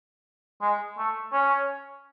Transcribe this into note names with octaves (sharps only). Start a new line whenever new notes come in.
G#3
A3
C#4